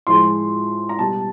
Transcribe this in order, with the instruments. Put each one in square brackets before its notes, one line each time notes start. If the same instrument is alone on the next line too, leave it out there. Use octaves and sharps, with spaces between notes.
[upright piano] A2 F3 G#3 C6
A#5
B2 G3 A5